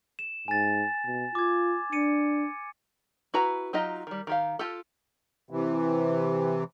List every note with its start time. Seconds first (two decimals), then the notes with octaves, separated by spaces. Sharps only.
0.19 E7
0.48 G#2 G#5 A6
1.06 B2
1.35 F4 D6 G#6
1.93 D4 C#7 D#7
3.34 E4 F#4 B4 A#5
3.73 F#3 D#4 F4 G4 D#5
4.07 D#3 G3
4.27 D#3 G4 F5
4.59 F4 G4 A4
5.50 C3 E3